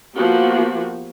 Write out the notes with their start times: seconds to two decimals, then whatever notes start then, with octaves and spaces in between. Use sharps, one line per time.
0.15 F3 A#3 B3 F#4 G4